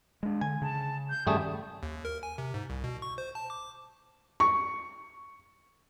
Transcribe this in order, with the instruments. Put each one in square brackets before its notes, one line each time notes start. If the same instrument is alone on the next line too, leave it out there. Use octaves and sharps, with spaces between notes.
[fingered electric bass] G#3 D4
[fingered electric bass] D3 [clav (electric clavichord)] G#5
[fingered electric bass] C#3 [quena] A5
[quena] G6
[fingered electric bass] G2 D#3 C#4 [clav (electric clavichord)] G3 A3 G#4 [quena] A5
[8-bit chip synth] D#2
A#4
G#5
C3
G#2
C2
B2
C#6
C5
A5
D6
[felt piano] C#6